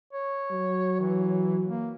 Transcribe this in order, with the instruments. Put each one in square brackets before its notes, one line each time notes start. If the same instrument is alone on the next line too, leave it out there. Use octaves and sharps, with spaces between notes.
[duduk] C#5
[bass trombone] F#3
[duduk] E3
A#3